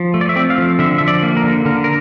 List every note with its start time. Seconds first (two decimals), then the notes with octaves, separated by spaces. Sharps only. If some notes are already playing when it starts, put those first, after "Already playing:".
Already playing: F3
0.14 A3
0.21 D5
0.29 E5
0.36 C4 D5
0.50 F5
0.58 F3
0.79 D3 E5
0.98 F3 E5
1.08 D5
1.23 A#3
1.37 A#4
1.44 D3
1.65 D3 A#4
1.84 A#4